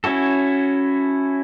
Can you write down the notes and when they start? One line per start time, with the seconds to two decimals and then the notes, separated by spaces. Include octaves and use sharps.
0.04 C#4 E4 F#4 A4